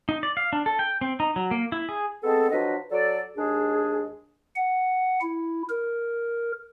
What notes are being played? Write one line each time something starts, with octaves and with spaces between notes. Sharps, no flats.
D#4
D5
F5
D4
A4
G5
C4
D#4
F#3
A#3
E4
G#4
G#3 B3 C4 G#4 A4
F3 F#3 D4 F#4 B4 D#5
F#3 A4 D5
D#2 G#3 D4 G#4
F#5
E4
A#4